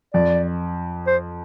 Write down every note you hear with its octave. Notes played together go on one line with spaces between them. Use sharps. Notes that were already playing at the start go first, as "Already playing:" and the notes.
F2 D5
C5